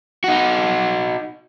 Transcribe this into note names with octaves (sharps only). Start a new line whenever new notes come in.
D#4 F#4